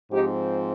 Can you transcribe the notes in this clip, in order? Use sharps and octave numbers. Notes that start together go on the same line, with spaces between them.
G#2 F3 C4 D#4 G4